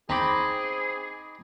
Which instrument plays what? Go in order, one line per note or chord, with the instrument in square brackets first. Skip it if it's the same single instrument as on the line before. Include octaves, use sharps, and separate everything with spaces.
[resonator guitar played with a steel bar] C4 [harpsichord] D#4 B5 D6 [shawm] G#4